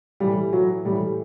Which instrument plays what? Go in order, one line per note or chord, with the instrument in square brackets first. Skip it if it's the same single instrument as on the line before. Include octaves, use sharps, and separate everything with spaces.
[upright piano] A2 E3 G3
F#3
A2 E3 G3